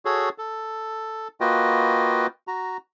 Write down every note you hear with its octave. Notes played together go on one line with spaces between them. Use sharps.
F#4 G#4 A4 C#5
A4
A#3 F4 F#4 B4 D#5 G5
F#4 A#5